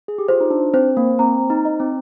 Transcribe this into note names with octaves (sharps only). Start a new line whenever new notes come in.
G#4
G4
F4 C5
D#4
D4
C4 C5
A#3
C4 A#5
D#4
D#5
C4